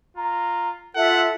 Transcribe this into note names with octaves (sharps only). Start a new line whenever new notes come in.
F4 A#5
F4 A4 E5 F#5